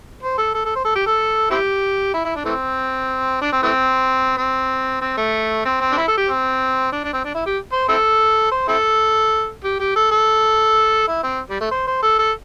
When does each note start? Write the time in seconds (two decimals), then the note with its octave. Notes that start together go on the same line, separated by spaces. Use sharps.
0.23 C5
0.38 A4
0.54 A4
0.65 A4
0.75 C5
0.85 A4
0.95 G4
1.06 A4
1.50 C4 E4 G4
2.14 E4
2.25 E4
2.36 D4
2.45 E3 A3 C4
3.41 D4
3.52 C4
3.63 E3 A3 C4
4.37 C4
5.01 C4
5.17 A3
5.65 C4
5.81 C4
5.92 D4
5.97 E4
6.08 A4
6.17 G4
6.28 C4
6.92 D4
7.04 D4
7.13 C4
7.24 D4
7.34 E4
7.46 G4
7.72 C5
7.89 C4 E4 A4
8.51 C5
8.68 C4 E4 A4
9.64 G4
9.80 G4
9.96 A4
10.11 A4
11.08 E4
11.23 C4
11.50 G3
11.60 A3
11.71 C5
11.87 C5
12.02 A4
12.19 A4